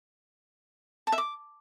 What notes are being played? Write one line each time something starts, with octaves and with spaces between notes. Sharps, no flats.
A5
E5
D6